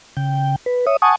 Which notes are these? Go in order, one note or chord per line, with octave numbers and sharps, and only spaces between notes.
C#3 G5
B4
C#5 E5 D#6
F#5 G#5 A5 C#6 D#6